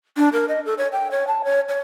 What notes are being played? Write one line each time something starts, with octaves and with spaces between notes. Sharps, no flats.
D4
A#4
D#5
A4
C#5
G5
C#5
A5
C#5
C#5